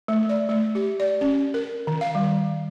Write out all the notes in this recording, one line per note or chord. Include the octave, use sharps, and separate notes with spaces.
A3
D5
A3
G4
D5
C#4
A#4
D#3
F5
G3